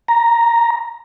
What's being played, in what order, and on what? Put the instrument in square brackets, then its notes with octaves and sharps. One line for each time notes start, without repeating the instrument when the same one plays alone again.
[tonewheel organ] A#5